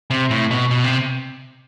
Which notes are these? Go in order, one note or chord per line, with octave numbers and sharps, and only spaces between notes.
C3
A2
B2
B2
C3